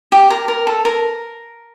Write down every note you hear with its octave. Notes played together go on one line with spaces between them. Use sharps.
G4
A#4
A#4
A4
A#4